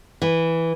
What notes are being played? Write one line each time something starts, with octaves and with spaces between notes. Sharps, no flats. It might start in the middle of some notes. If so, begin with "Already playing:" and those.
E3